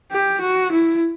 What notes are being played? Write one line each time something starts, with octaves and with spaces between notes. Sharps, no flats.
G4
F#4
E4